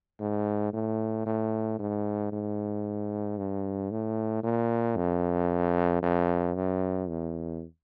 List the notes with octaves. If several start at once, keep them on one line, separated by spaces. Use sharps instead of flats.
G#2
A2
A2
G#2
G#2
G2
A2
A#2
F2
F2
F#2
E2